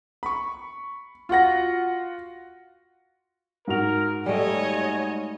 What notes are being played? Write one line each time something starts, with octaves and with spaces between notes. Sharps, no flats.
B5 C#6
F4 F#4 F#5 A#6
G#2 F#4 A#4 F7
G3 A3 C#5 D#5 G#5